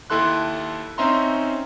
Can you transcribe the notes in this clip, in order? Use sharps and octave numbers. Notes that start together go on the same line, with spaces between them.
D#2 E4 A4 C6 F#6
C4 C#4 D#4 E5 A#5 C6